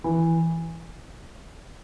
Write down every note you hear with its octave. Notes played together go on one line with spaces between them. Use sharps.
E3